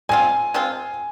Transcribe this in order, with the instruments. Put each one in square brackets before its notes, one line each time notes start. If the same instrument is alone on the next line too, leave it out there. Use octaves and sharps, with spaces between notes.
[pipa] G#3 C4 F4 [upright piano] G#5
[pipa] G#3 C4 F4